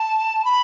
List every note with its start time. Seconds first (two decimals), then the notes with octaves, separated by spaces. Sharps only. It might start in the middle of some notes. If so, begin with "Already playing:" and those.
Already playing: A5
0.45 B5